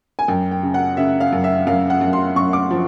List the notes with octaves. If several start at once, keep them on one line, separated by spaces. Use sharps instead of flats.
G#5
F#2 G5
G5
C#3
F#5
C#3 E5
F5
F#2
E5
F#2 F5
F#5
F#2
C6
F#2 C#6
D6
F3